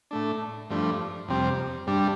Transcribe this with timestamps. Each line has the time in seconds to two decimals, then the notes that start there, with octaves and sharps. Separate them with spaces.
0.11 A2 A3 D4
0.70 G2 F3 A3 D4
1.28 F2 C3 G3 C4
1.87 G2 G3 D4